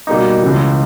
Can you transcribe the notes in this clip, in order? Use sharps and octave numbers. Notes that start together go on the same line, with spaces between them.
B2 G3 A#3 D#4
C#2 C#3 E3